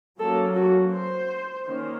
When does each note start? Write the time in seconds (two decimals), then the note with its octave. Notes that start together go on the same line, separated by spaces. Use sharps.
0.18 F#3 A#3 C#4 A4
0.55 F#4
0.92 C5
1.67 D#3 A#3 C#4